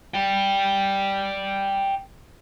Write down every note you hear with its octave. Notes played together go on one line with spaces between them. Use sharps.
D5 G5